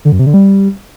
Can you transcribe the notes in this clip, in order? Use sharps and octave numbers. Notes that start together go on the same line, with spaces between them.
D3
F#2
C3
D3
G3